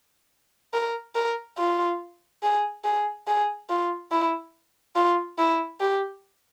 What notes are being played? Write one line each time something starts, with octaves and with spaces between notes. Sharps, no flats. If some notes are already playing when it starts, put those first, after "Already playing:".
A#4
A#4
F4
G#4
G#4
G#4
F4
E4
F4
E4
G4